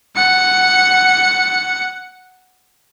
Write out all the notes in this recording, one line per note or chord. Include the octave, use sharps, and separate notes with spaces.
F#5 C#7